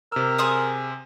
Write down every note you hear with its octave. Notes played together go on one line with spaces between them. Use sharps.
C3 A#4 E6
G#4 C5 D#6